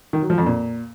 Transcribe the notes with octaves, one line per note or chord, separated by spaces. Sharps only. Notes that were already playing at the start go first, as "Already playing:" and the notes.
D#3
F#3
F3
F2
A#2